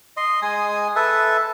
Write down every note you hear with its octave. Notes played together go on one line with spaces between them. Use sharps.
D#5 C6
G#3 G#5 D#6
A4 B4 E5